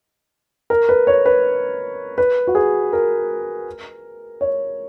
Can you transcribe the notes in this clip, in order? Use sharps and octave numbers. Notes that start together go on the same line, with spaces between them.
A#4
B4
C#5
B4
B4
F#4
G#4
A#4
C#5